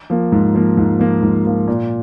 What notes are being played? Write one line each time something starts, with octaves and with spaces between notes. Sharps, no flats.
F3 A#3
G#2
F3 A#3
G#2
F3 A#3
G#2
F3 A#3
A#2